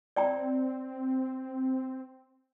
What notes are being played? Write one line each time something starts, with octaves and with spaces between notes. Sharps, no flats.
C4 D5 G5 A#5